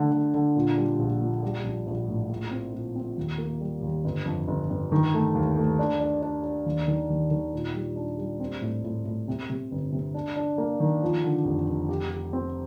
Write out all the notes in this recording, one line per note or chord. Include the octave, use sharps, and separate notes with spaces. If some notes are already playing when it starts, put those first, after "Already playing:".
Already playing: D3 A3
D3
D3
A#2
G3
A#1
A#2
G3
A#1
A#1
A2
A#2
C4
A#2
C4
D#2
A#3
G3
D#2
G1
F2
G1
G1
D#3
A3
D#2
A3
D4
D4
D4
D4
D#2
D#3
D#2
D#3
A#2
G3
D4
G3
C4
A2
A2
A2
C3
C3
G1
C3
D4
D4
A#3
D#3
F3
D3
F1
F1
G4
G4
C4